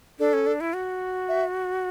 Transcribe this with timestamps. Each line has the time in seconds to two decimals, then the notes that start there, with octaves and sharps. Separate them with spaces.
0.19 D4 A4
0.33 C#4
0.47 D4
0.61 E4
0.73 F#4
1.29 E5